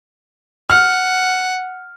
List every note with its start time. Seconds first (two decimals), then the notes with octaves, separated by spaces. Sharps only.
0.70 F#5 F6